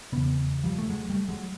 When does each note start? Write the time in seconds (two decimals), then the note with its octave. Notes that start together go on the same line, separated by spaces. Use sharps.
0.12 F1 E2 C#3 B3
0.64 F3 G3
0.79 A3
0.89 F#3 G#3
1.10 G3 A3
1.29 F#3 G#3